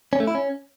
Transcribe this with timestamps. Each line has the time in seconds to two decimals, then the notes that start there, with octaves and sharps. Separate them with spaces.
0.13 C#4
0.20 A3
0.27 E4
0.35 C#4